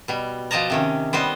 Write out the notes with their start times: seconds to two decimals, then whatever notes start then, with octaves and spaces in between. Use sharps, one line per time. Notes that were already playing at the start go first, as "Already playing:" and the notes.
0.08 B2 G3
0.51 B2 F3 G4 D#5 A5 A#5
0.70 C3 D#3 C#4
1.13 G3 B3 C5 D#5